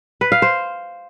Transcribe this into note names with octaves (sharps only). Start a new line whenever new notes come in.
B4
F5
C5